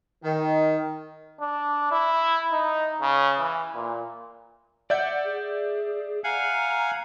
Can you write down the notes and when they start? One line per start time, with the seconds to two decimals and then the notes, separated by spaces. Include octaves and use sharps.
0.24 D#3
1.40 D4
1.92 E4
2.52 D#4
3.01 C#3
3.40 E3
3.75 A#2
4.90 D5 E5 F#5 G6
5.24 G#4
6.24 F5 F#5 G#5 A#5